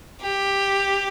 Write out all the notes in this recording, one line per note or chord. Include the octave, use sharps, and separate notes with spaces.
G4